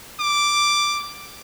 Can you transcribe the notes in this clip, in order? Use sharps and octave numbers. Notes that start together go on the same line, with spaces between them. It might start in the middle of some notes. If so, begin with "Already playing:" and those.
D6